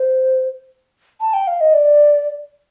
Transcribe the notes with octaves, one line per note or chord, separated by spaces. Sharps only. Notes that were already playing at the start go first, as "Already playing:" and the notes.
Already playing: C5
A5
G5
F5
D#5
D5